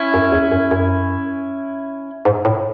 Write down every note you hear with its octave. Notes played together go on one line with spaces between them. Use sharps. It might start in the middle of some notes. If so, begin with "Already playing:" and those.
Already playing: C#4 E4
F#2
E2
F#2
F#2
G#2
A2